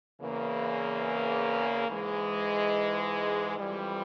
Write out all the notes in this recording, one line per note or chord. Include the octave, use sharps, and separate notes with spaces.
E2 C#3 E3 A#3
G#2 E3 G#3
F2 E3 G3